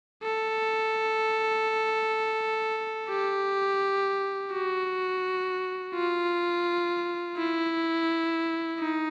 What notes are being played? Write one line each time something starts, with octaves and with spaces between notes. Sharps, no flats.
A4
G4
F#4
F4
E4
D#4